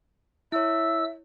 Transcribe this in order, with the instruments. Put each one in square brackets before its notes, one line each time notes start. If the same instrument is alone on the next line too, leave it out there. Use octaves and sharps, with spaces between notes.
[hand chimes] E4 C#5 [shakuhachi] E5 [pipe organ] E6